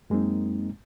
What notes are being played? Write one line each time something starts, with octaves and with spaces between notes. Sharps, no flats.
F#2 G#3 A#3 C4 D#4